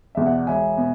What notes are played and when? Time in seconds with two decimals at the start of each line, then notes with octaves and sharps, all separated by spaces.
0.15 E2 B2 E5
0.26 D5 F#5
0.47 E1 E5 G#5
0.77 B2